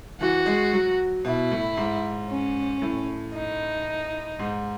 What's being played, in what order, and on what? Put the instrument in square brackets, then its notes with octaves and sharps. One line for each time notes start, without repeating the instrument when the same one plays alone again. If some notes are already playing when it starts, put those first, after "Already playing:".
[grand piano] E3 [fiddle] F#4
[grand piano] G#3
F#3
[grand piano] B2 [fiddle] E4
[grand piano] A2
G#2
[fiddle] C#4
[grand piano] A2
[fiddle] D#4
[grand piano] G#2